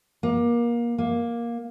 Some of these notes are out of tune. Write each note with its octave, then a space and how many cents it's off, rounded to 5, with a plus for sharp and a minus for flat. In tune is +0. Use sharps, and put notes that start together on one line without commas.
A#3 +25
A#3 +10